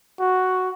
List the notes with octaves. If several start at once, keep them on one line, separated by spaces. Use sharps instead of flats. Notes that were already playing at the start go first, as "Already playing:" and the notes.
F#4